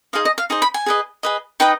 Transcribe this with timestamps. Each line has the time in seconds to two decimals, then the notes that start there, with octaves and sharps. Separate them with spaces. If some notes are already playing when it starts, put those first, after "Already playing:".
0.13 D#4 G#4 C5 D#5 F5
0.25 D#5
0.38 F5
0.50 D#4 G#4 C5 D#5
0.62 B5
0.74 G#5
0.86 G#4 B4 D#5
1.23 G#4 B4 D#5
1.60 D#4 B4 D#5 G5